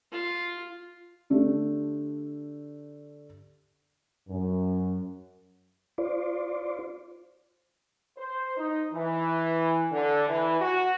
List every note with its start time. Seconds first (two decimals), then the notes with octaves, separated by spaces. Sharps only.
0.11 F4
1.30 D3 A3 G4
4.28 F#2
5.98 F4 C5 D5
8.18 C5
8.57 D#4
8.93 E3
9.92 D3
10.28 E3
10.60 F#4